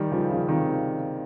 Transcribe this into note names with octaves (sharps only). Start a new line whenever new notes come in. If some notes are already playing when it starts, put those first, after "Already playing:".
Already playing: D#3 G3
C#3 F3
C#3 F3
C3 D#3